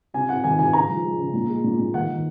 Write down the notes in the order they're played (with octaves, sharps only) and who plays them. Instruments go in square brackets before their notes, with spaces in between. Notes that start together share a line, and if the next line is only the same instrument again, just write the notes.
[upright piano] C3 G#5
C3 F#5
D#3 G#5
D#3 G#5
C#3 A#5
F3
G#3
C#3
A#2
G#3
A#2
A#2
D#3 F#5
D#3